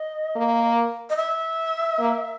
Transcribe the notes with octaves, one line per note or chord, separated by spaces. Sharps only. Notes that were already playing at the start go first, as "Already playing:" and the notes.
Already playing: D#5
A#3
D#5
E5
A#3